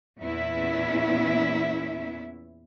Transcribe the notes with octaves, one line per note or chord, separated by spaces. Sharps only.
E2 A#2 B3 C#4 E4 E5